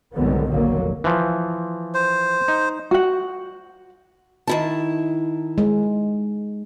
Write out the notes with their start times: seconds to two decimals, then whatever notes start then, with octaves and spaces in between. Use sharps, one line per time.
0.14 C2 G#2 D3 D#3 F#3 B3
0.49 F1 A#1 D3 F#3 A#3
1.04 E3 F3
1.95 C5
2.48 D#4
2.91 F#4 F#5
4.47 D#3 E4 A5
5.58 G#3